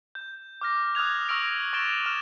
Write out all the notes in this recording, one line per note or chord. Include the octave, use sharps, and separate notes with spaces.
G6
D6 F6 A#6
D#6 F6 F#6 G#6 F7
C#6 E6 F6 A#6 D7
C#6 A6 D7 E7 G7
F6 E7